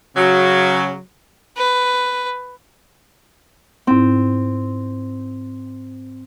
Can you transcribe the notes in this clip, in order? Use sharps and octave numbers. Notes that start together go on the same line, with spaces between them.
C#3 F#3
B4
G#2 C4 D#4 E4